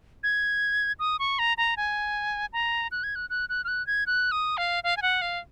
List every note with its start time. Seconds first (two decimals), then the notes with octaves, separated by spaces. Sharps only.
0.23 G#6
0.99 D#6
1.19 C#6
1.39 A#5
1.57 A#5
1.77 G#5
2.53 A#5
2.92 F#6
3.04 G#6
3.15 F#6
3.30 F#6
3.49 F#6
3.64 F6
3.68 F#6
3.87 G#6
4.07 F#6
4.32 D#6
4.57 F5
4.84 F5
4.97 G#5
5.02 F#5
5.22 F5